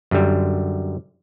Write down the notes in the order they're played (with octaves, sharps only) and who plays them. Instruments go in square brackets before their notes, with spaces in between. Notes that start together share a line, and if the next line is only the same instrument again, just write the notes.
[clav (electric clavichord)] F#2 D3 G3